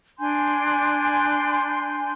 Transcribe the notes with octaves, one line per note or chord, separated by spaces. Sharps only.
D4 G#5 C6 G6